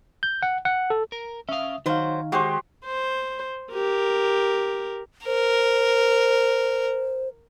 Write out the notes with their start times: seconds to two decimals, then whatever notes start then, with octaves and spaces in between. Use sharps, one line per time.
0.23 G6
0.43 F#5
0.65 F#5
0.90 A4
1.12 A#4
1.49 C#4 E5 F5 D#6
1.86 D#3 F#3 D#4 C5 F5
2.32 G#3 F#4 G4 C5
2.85 C5
3.73 G4 A#4
5.26 A#4 C5